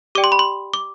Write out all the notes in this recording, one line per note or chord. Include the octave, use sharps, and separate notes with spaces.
G4 D5 G5 D6
C6
B5
C6
D6